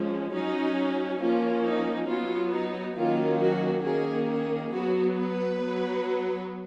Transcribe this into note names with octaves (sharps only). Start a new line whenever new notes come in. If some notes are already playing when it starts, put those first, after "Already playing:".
Already playing: F3 G#3 C#4
F#3 C#4 D#4
F3 A#3 C#4 F4
D#4
F#3 B3 F4
D#4
D#3 F#3 A#3 C#4 F4
F#4
D#3 A#3 C#4 G#4
G#4
F#3 B3 F#4
B4
F#3 B3